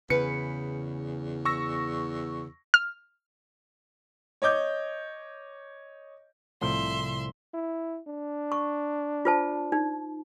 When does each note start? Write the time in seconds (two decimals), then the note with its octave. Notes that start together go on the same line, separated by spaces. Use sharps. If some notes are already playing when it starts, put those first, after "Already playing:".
0.10 E2 C#3 B4 C#7
1.45 C#6 E6 A#6
2.74 F6
4.42 C#5 D#5 D6 G6
6.61 C2 A2 F3 E5 C6
7.54 E4
8.07 D4
8.52 C#6
9.25 F4 C5 A5
9.72 D#4